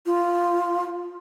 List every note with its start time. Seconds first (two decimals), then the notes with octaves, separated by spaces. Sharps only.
0.06 F4